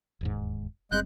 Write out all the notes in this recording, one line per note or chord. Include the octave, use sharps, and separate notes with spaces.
E1 D#2 G#2
F#1 G3 G#3 C4 F#6 G6